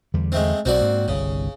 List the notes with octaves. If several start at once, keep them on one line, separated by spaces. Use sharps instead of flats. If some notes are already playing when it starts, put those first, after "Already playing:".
E2 D3 G3
G#3 A3 C4
B1 C4 F#4 D5
G#2 A#3
G1 C2 C#3